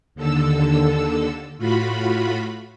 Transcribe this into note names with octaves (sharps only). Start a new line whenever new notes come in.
D#2 D3 A4 E6
A2 F4 F#4 B5